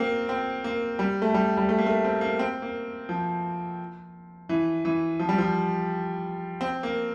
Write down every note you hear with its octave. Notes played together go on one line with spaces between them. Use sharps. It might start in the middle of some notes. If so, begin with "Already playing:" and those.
Already playing: A#3 C4
C4
A#3
G3
A3
G3
G3
A3
A#3
A3
C4
A#3
C4
A#3
F3
E3
E3
F3
G3
F3
C4
A#3